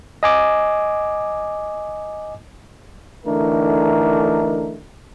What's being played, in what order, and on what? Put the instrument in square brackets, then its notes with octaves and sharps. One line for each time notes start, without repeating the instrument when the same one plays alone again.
[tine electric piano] D#5 G#5 D6
[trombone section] D3 E3 A3 D4 D#4 A#4